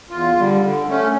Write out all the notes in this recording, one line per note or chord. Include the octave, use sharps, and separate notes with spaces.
E2 F4
D3 G3
D3
A3 C#4